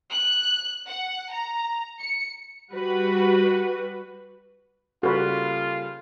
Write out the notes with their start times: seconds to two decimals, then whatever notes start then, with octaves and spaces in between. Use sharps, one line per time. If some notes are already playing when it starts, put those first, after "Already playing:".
0.15 F#6
0.88 F#5
1.33 A#5
2.00 C#7
2.72 G3 F#4 B4
5.03 C#3 G3 A#3 F4 F#4 A4 B4